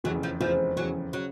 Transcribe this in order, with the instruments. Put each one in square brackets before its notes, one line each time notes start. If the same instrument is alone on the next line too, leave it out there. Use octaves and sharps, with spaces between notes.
[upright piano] F1 E2 C#3 [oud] F#3
[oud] F3
[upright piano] F1 E2 C#3 [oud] F3
[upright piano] F1 E2 C#3 [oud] F#3
[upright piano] C#3 [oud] F#3